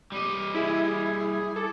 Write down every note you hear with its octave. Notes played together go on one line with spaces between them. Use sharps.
G3 D#5 D6
E4 G#4
A4 D6